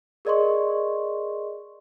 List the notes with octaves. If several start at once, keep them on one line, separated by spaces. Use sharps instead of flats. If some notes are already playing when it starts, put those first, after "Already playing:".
G#4 A#4 D5 D#5 C6 C#6